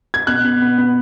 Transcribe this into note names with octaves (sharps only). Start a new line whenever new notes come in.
G#6
B2 F#6
B2
B3
B3